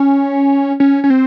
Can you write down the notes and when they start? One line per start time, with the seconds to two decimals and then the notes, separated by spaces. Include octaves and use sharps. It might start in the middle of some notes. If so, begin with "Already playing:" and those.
Already playing: C#4
0.80 C#4
1.04 C#4
1.10 C4